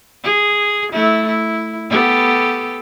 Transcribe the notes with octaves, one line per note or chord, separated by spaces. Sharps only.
G#4
A3 E4
E4
B3 G4 A4